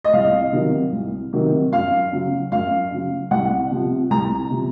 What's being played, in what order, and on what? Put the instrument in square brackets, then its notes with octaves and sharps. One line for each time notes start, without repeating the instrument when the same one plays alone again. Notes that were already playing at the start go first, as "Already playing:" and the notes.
[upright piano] D#5
C2 F5
C3 D#3 F#3
C2
C3 D#3 F#3
F#2 F5
C#3 F#3
F#2 F5
C#3 F#3
C2 F#5
C3 F3
C2 A#5
C3 F3